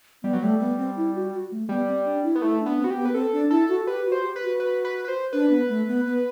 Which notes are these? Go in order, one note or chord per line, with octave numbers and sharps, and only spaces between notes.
G3 B3
F#3
G3 A3
B3
C4
E4
F#4
F#4
A3
G3 B3
C4
D4
E4
B3
A3 E4
D4
B3
C4
F#4
G4
B3
B4
C4 A4
D4
E4 A4
F#4
G4 B4
F#4
C5
G4
B4
F#4
B4
B4
B4
C5
D4 B4
B3
A3
B3
B3